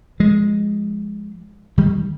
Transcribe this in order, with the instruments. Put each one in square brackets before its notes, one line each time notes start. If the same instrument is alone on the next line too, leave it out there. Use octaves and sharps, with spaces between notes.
[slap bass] F3 G#3
D#3 G3